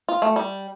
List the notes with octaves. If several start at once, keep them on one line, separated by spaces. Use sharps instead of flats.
F4
A3
G3